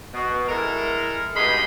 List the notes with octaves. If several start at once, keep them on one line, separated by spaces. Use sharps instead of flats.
B2
G#3 E4 A4 A#4
G2 B2 G#3 D#4 B5 C6